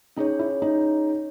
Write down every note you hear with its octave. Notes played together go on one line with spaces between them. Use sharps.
C#4 D#4 G#4 C#5
E4
D#4